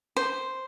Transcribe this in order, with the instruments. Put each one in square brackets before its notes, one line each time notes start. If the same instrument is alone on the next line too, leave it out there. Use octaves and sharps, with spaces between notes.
[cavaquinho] C5